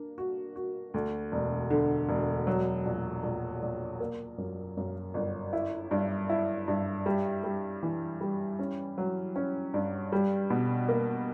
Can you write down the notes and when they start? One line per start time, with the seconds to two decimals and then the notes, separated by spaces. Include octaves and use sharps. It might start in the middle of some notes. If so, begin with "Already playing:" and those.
Already playing: A#3 D4
0.18 F#4
0.56 F#4
0.94 D2
1.32 E1
1.70 D3
2.09 E1
2.47 F#3
2.85 A#1
3.23 A#1
3.62 A#1
4.00 A#3
4.38 F#2
4.77 F#2
5.14 G1
5.53 E4
5.91 G2
6.29 E4
6.68 G2
7.06 G3
7.44 G3
7.83 E3
8.21 G3
8.59 C#4
8.98 F#3
9.36 C#4
9.74 G2
10.12 G3
10.50 B2
10.88 A#3